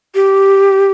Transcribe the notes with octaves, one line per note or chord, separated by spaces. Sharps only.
G4